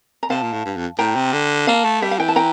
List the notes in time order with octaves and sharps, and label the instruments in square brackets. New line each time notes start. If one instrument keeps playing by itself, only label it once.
[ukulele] A#5
[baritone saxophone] C3 [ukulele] F5 A5
[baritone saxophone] A#2
A2
G2
F2
[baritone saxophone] A2 [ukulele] G5 A#5
[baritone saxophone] C3
D3
[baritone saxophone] A#3 [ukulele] F5 A5
[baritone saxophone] A3
[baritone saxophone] G3 [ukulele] E5
[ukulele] F5
[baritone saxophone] E3 [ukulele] G5
[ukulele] A5
G5 A#5